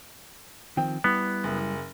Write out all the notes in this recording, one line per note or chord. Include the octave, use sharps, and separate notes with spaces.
D#3 F3 C4 G5
G3 B3 E4
F#1